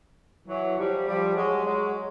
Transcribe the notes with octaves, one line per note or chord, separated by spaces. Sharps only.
E3 F#3
F3 G3
F3 G3
F#3 G#3
F#3 G#3